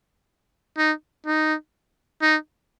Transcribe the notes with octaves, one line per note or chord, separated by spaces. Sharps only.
D#4
D#4
D#4